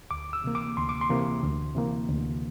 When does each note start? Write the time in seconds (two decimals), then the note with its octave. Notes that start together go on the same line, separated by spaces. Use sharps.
0.11 D2 D6
0.33 E6
0.44 C3 E3 A#3
0.55 D6
0.77 D2 C6
0.89 D6
1.01 C6
1.10 C3 E3 A#3
1.43 D2
1.75 C3 E3 A#3
2.09 D2